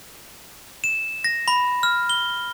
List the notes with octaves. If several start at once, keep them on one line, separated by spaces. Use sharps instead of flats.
E7
A#6
B5
F6
G7